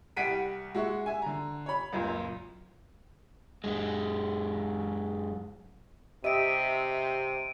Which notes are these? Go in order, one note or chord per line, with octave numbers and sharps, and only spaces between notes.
C2 G3 F#5 B6 D7 D#7
G#3 F#4 E5 C#6
E5 G#5
D3 A#5
C#5 B5
C#2 F#2 A#2
F#2 G#3
C3 G4 D#5 E5 D7 D#7